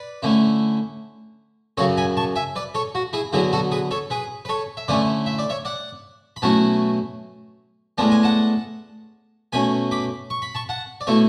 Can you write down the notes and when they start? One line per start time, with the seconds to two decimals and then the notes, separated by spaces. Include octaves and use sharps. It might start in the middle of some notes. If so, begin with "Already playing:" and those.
Already playing: B4 D5
0.22 D3 A3 C#4 E4
1.77 F#2 C#3 F#3 A4 C#5
1.97 G#5 B5
2.17 A5 C#6
2.36 E5 G#5
2.56 B4 D5
2.74 A4 C#5
2.95 F#4
3.13 E4 G#4
3.33 D3 F#3 B3 E4 G#4
3.53 F#4 A4
3.71 G#4 B4
3.91 A4 C#5
4.10 G#4 B4
4.45 B4
4.49 A4 C#5
4.77 E5
4.88 D3 A3 C#4 E4 B4 D5
5.26 E5
5.39 D5
5.50 C#5 E5
5.65 D5 F#5
6.36 B5
6.42 B2 F#3 A3 C#4 E4 F#5 A5
7.98 A2 G#3 B3 D4 A5
8.11 G#5
8.23 F#5 A5
9.53 B2 A3 C#4 G#5 B5
9.91 B5 D6
10.30 C#6
10.42 B5
10.55 A5 C#6
10.69 F#5 A5
11.01 D5
11.07 B2 A3 E4 A4 C#5